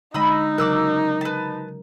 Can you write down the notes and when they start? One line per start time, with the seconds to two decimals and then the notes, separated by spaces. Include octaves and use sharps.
0.14 D3 G#3 D#4 D#5 B5 E6
0.58 C#3 F#3 A#4 D6 E6 F#6
1.21 B4 A5